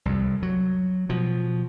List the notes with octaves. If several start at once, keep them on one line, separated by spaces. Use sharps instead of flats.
C2 F2
F#3
B2 F3